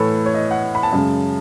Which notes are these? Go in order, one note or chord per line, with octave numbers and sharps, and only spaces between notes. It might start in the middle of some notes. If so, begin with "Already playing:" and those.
Already playing: A2 E3 A3 A4 B4 C#5
C#5
D#5
F#5
B5
A5
F#2 C#3 G#3